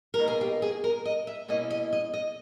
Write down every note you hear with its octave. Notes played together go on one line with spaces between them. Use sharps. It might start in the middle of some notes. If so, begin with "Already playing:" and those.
A#4
B2 A#3 D#4
G#4
G4
G#4
A#4
D#5
E5
B2 A#3 C#4 E4 D#5
D#5
D#5
D#5